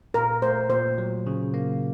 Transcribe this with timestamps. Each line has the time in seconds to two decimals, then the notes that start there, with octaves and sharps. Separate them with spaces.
0.14 A#2 A#4
0.42 A3 C5
0.70 A#2 C5
0.98 F#3
1.27 C#3
1.54 A#3